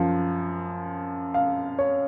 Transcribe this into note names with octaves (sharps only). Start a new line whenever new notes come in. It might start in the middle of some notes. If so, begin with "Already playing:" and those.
Already playing: F#2 F3
F5
C#5